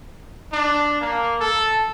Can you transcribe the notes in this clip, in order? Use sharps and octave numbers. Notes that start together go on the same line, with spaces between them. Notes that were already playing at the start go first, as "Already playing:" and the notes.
D4
A#3
A4